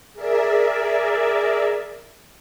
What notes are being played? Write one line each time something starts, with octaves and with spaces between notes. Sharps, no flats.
G#4 A#4 D5 E5